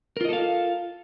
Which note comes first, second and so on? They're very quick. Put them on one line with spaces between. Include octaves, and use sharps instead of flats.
A#4 F4 D#5 A4 F5